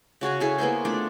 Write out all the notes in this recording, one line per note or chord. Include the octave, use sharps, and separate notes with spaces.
C#3 F#4 G#4 C#5
E4 G#4 A4
A#3 B3 E4 C5
A3 D4 F4 D5